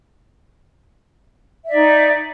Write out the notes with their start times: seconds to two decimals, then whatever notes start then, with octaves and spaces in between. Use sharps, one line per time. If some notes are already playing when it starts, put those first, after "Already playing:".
1.64 E5
1.69 D5
1.73 D#4